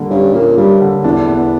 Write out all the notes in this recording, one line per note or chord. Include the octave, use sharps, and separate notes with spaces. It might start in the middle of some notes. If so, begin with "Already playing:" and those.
Already playing: D3 G3 A#3
G2 C#4
A#2 A#3
G2 G3
D3
E2 D4
B3